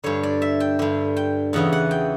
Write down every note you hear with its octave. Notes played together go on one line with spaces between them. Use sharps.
G2 D3 C#5
D5
E5
G5
G2 D3
G5
E2 C#3 E3 F#5
F#5
G5